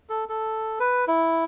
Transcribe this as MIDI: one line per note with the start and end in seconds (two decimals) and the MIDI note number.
0.09 0.24 69
0.29 0.79 69
0.80 1.05 71
1.08 1.44 64